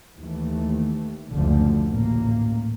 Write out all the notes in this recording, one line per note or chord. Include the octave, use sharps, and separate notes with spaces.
D#2 E3 A3
F#1 D2 D3 F3 A3
A1 A#2 A#3